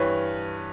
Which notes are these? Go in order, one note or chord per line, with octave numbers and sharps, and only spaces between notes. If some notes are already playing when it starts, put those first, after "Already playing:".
Already playing: G2 E3 B4 C#5